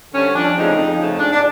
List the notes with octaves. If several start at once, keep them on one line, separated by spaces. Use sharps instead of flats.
D3 G3 C4 C#4
F2 D4
C#3 F3 A3 C4 D#4
F2
C#3 F3 A3 C4
G#2 D4
D4